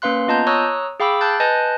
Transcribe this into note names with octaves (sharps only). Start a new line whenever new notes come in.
A#3 C#4 B4 F5 C6 F#6
B3 F4 D#5 A5 A#5 G6
C#5 A#5 C#6 D#6 E6 F#6
G#4 F5 G5 B5 D6 E6
A5 F#6 G6 A6
B4 D#5 G#5 A5 F#6 G6